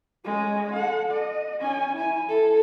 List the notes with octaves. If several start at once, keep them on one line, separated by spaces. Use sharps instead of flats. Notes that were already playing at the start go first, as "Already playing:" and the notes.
G#3 C#4
A4 F#5
D#5
C#4 G#5
E4 G#5
A4